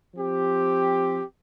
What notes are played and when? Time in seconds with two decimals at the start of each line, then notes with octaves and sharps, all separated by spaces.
0.15 F3 C4 G4